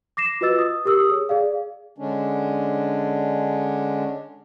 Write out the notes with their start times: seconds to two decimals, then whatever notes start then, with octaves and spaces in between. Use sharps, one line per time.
0.17 D6 A#6 C7 E7
0.41 F4 F#4 B4 D#5 E6 A6
0.59 D#6
0.85 G4 A#4 D#6 E6
1.10 G#4 C#5
1.29 G#4 D5 F5
1.98 D3 G#3 C#4 D4